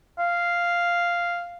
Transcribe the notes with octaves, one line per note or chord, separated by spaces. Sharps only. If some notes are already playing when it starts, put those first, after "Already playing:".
F5